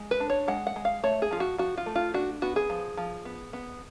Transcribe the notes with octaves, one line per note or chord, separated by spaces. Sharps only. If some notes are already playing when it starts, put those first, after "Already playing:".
Already playing: G#3
B4
D4
C#5
G#3 F#5
F#5
G#3
F5
A3 C#5
G#4
F3 F4
F#4
F3 F#4
F4
A3
F4
D4 F#4
B3 F#4
G#4
F3
F3
B3
B3